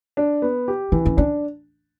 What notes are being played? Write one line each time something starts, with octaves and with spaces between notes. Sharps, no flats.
D4
B3
G4
E3 C#4
C#4
C#4 D4